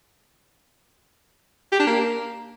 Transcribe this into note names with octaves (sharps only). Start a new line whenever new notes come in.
G4
D4
A#3